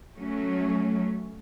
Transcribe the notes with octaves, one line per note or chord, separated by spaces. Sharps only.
F#3 A3 C#4